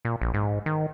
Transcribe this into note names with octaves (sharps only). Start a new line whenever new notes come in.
A#2
A#1
G#2
D#3